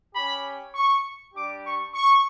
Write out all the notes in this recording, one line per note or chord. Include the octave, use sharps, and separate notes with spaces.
C#4 G4 B5
C#6
G3 D4 G4 D6
C#6
C#6